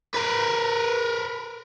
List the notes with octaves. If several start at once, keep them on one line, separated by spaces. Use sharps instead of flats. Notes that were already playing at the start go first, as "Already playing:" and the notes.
A#4 B4